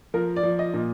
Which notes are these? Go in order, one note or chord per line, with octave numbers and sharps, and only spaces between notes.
F3 A#4
D5
F3
D#5
A#2